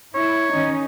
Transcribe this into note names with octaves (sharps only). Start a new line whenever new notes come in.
E4 C#5
D#3 C#4 D#4